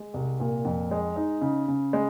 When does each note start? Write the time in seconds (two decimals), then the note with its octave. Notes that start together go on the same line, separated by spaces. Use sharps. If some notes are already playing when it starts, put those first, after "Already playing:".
Already playing: G#3
0.14 C2
0.40 A#2
0.65 F2
0.91 G#3
1.16 D#4
1.41 C#3
1.68 C#3
1.93 G#3